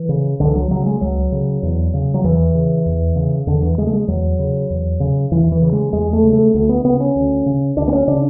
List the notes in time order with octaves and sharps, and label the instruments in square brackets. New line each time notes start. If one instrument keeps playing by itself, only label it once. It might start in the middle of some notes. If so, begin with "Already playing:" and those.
Already playing: [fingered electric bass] E3
C#3
C#2 D3
E3
F#3
C#3 F#3
G#3
C#2 F#3
C#3
E2
C#3
F#3
E2 E3
C#3
E2
C#3
E2 D3
E3
C#3 G#3
A3
G#3
E2 F#3
C#3
E2
C#3
E2 E3
E3
C#3
G#3
E2 G#3
A3
C#3
A3
D2 A3
B3
C#3 B3
C#4
D2
C#3
D2 D4
B3
C#4
C#3 D4